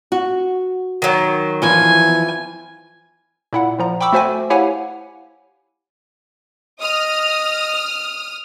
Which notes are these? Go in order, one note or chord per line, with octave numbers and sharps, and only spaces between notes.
F#4
D#3 F#3
E2 E3 F3 G#5
A#2 E4 F#5
A#2 F3 A#5
G5 B5 C#6 D6 E6
A3 F#4 C5 E5 G#5
E4 G4 C#5 F5 F#5 G#5
D#5 D#6 F6